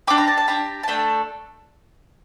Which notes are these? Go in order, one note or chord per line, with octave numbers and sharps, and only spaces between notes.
D4 G4 D6
A#5
A5
A5
D4 G4 A#5
A5
A3 D4 A4 G5